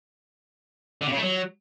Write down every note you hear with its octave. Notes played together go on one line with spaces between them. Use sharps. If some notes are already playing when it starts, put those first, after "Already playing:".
D3
C3
C#3
A3
F#3